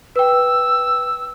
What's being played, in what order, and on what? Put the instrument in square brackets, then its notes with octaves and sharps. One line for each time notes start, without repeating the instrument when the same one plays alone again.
[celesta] B4 G5 [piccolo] E6